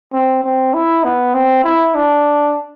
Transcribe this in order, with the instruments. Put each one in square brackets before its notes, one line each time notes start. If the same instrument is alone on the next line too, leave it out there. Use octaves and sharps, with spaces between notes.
[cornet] C4
C4
E4
B3
C4
E4
D4